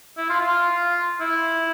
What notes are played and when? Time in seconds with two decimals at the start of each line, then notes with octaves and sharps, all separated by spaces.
0.17 E4
0.30 F4
0.40 F4
1.21 E4